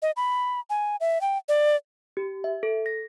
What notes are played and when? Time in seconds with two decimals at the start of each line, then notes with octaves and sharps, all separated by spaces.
0.02 D#5
0.16 B5
0.70 G#5
1.00 E5
1.21 G5
1.49 D5
2.17 G4
2.44 E5
2.63 A4
2.86 A#6